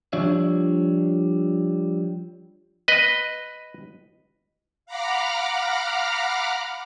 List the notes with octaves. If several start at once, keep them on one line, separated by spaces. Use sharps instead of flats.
F3 G3 D4 C#5 E5
B4 D#5
F5 F#5 A#5 B5 D6 F6